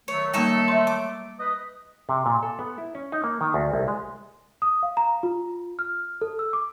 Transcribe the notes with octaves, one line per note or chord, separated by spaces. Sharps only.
D#3 F#3 A3 C#5
G3 A#3 D#4 A4 C#6
E5 C6
A5 D6
B4 D#5
C3
A#2
A4
B3
E4
C#4
D#4
A#3
D#3
D2
C2
G#3
D#6
F5
A#5
F4
F6
A4
E6
D6